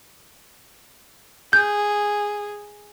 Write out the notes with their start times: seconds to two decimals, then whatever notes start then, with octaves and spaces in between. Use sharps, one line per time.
1.53 G#4 G6